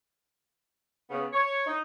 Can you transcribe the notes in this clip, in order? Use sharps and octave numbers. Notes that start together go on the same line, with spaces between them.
C#3 B3
C#5
D#4